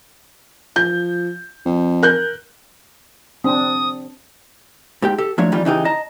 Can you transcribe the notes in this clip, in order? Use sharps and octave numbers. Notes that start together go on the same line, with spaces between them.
F3 G6
F2
A#4 F#6 G6
C4 D4 D#6
G#2 G4 G5
G4 A4
F3 F#3 A3 D4 F4 C#5
F2 D#3 E3 G3 F4
C#3 E3 D#4 G4
D#5 A5 A#5